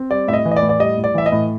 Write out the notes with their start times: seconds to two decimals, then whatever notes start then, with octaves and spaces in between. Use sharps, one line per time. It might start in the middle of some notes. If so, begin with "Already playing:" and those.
Already playing: C4
0.10 G3 D5
0.28 A2 E5
0.33 D#5
0.45 E3
0.51 D#5
0.56 D5
0.62 A2
0.69 D5
0.79 G3 D#5
0.98 A2
1.04 D5
1.14 E3 E5
1.26 D#5
1.32 A2